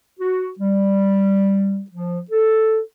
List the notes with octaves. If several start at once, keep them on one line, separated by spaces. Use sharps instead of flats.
F#4
G3
F3
A4